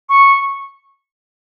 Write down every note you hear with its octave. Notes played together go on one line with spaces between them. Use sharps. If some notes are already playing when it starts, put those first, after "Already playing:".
C#6